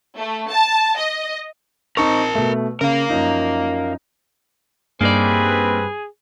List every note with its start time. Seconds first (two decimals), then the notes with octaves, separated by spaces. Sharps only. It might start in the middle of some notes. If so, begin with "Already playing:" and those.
0.17 A3
0.50 A5
0.96 D#5
1.97 C4 D#4 A#4 A5 C#6
2.35 B2 A3
2.81 C#3 A#4 F5
3.10 F#2 F3 D#4
5.01 G2 A#3 C4 D#4 G#4 B4 D5